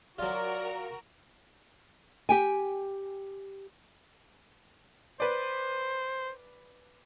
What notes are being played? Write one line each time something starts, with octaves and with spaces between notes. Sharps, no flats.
F#3 F4 F#4 A#4 D5
G4 G5 G#5
B4 C5 D5